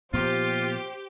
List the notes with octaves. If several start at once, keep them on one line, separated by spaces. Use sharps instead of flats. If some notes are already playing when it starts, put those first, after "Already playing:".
A#2 F3 B3 F4 G4 C5